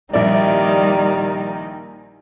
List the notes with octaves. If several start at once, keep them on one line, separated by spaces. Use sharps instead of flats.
A#1 D#3 G3 E4 D5